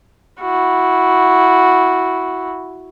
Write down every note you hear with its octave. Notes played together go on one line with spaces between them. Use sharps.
E4 F#4